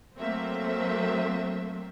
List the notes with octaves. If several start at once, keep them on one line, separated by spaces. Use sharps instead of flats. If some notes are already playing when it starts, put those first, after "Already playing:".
F#3 A3 A#3 C4 C5 E5